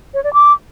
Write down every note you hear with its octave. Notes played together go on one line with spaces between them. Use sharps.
C#5
D5
D6